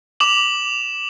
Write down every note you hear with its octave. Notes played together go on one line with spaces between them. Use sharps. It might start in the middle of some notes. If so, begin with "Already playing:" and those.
D6 E7 F#7